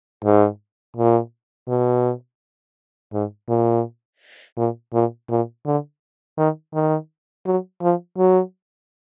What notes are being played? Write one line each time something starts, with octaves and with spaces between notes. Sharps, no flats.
G#2
A#2
B2
G#2
A#2
A#2
A#2
A#2
D3
D#3
D#3
F#3
F3
F#3